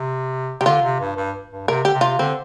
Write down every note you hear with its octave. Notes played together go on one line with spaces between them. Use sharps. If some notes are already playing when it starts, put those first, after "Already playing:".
Already playing: C3
C3 G4
D3 F4
C3
G2
G2
G2
C3 A#4
D3 G4
C3
F4
D3 C4